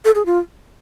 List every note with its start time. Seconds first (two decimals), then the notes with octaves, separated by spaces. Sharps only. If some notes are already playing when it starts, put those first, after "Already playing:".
0.05 A4
0.15 G#4
0.26 F4